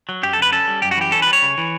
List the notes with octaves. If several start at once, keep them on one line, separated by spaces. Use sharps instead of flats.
F#3
F#2 G4
A4
D3 B4
C#4 A4
G3
F#2 G4
F#4
E3 G4
C#4 A4
B4
G3
C#5
C#3
E3